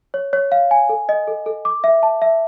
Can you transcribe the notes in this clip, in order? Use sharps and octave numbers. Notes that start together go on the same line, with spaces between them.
C#5
C#5
F5
G#5
A4
D#5
A4
A4
D6
E5
A5
E5